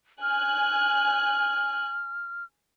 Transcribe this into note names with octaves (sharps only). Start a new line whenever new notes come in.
G#5 F6 F#6